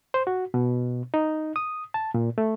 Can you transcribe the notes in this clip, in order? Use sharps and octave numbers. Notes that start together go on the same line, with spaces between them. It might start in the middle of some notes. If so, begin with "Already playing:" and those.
C5
F#4
B2
D#4
D#6
A5
A#2
A3